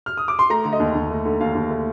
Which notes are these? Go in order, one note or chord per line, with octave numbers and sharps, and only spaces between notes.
F6
D#6
D6
C6
A3 A#5
D3
D#5
D#2
D#2
A3
D3
D#2 F5
D#2
A3